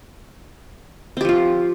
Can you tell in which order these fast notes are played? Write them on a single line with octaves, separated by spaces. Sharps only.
C4 G4 F3 F4